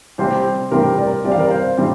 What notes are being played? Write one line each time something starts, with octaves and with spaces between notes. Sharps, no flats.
C3 G3 C4 G4 C5
C3 G3 C4 G4 A#4
A#4 D5
C3 G3 C4 G4 D5
F5
A#4 D5
C5 F5
C3 G3 C4 G4